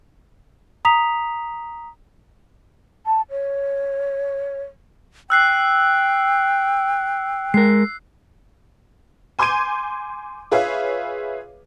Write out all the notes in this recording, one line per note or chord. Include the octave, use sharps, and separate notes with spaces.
A#5 D#6 B6 F7
A5
C#5
G5 E6 F#6 C7
G#3 A#4 C7
G#5 C6 D6 G6 G#6 D#7
F4 G#4 B4 C#5 E5 F5